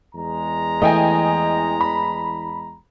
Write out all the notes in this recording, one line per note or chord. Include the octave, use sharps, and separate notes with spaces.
E2 G#3 A#5
E3 A3 D#5 G5 G#5
B5